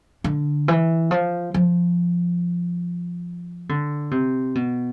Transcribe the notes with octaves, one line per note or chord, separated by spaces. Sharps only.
D3
E3
F3
F3
D3
C3
B2